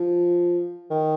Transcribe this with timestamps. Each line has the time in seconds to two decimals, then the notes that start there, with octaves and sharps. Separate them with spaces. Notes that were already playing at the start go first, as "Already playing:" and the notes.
Already playing: F3
0.91 D#3